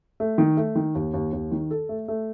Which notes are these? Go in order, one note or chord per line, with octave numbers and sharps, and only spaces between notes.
A3
D#3
A3
D#3
D#2
D#2
D#2
D#3
A4
A3
A3